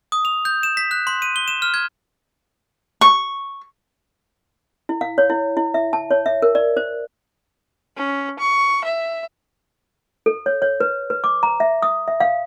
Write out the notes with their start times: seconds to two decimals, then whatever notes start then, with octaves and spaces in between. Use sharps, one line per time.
0.12 D#6
0.25 F7
0.45 G6
0.63 E7
0.77 B6
0.91 F#6
1.07 C6
1.22 D#7
1.36 G7
1.48 E7
1.62 F6
1.74 G#6
3.01 C#6
4.89 E4
5.01 F5
5.18 C#5
5.30 E4
5.57 E4
5.74 E5
5.93 A5
6.11 C#5
6.26 E5
6.42 A#4
6.55 D5
6.77 C5
7.96 C#4
8.39 C#6
8.84 E5
10.26 A4
10.46 C#5
10.62 C#5
10.80 B4
11.10 B4
11.24 D6
11.43 A#5
11.60 E5
11.82 D#6
12.08 E5
12.20 F5